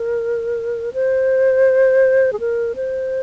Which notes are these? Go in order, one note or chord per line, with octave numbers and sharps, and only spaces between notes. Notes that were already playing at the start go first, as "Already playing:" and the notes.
Already playing: A#4
C5
G#4
A#4
C5